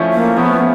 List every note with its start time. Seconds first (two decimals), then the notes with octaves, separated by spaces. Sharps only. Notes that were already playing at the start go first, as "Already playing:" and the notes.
Already playing: F3 A3 C#4 E4
0.13 A#3
0.37 F3 A3 B3 C#4 E4